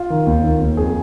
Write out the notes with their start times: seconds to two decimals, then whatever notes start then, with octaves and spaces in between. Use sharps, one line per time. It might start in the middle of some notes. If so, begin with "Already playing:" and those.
Already playing: F4
0.10 D#3
0.27 D#2
0.44 D#3
0.60 D#2
0.77 F2 G#4